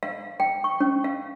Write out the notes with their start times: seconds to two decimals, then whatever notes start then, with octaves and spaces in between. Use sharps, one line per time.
0.03 F5
0.40 G5
0.64 C#6
0.80 C#4
1.04 F5